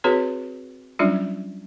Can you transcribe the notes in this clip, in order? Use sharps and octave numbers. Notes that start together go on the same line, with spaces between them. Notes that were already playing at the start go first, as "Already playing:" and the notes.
C4 F#4 G#4 B4 C#5 C6
F#3 G3 C#4 D4 F4 D5